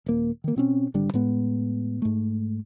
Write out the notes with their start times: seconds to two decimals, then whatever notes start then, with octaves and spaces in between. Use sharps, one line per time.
0.06 D#1 A#3
0.44 D#3 A#3
0.56 B2 C4 C#4
0.94 G#1 D3 G3 D4
1.14 A2 G#3 B3
2.02 G#2 A3